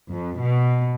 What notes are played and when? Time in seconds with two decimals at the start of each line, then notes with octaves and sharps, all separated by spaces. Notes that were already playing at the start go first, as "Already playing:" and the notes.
0.12 F2
0.41 B2